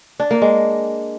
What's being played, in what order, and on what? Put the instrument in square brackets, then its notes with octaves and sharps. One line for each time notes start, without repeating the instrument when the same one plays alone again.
[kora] D4
A#3
G#3